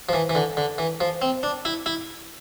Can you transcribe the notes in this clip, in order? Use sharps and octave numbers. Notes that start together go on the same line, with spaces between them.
F3
E3
E3
D3
D3
E3
F3
C4
D4
E4
E4